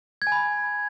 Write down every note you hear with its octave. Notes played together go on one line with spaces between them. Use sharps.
G#6
G#5
B5